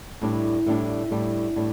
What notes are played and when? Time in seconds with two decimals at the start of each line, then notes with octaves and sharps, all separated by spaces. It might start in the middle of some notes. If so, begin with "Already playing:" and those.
0.21 A2 G3 D4
0.66 A2 G3 D4
1.11 A2 G3 D4
1.56 A2 G3 D4